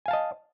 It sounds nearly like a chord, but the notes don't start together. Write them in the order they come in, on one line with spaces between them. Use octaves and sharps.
G#5 F5 A5 D#5